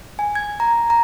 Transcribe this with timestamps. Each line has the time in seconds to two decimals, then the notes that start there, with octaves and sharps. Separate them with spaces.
0.19 G#5
0.35 G#6
0.60 A#5
0.90 A#5